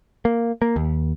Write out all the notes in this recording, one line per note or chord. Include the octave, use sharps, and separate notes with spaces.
A#3
A#3
D#2